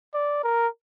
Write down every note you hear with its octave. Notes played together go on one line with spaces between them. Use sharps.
D5
A#4